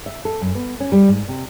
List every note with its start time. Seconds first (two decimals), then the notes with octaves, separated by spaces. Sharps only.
0.06 E5
0.25 A4
0.41 F#2
0.55 B3
0.80 C#4
0.92 G3
1.08 G#2
1.28 C3